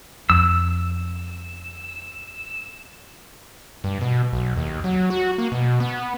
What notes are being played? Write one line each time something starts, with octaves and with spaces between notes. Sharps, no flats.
F2 E6
G2
B2
B1
D#2
F#3
F#4
A#3
B2
B3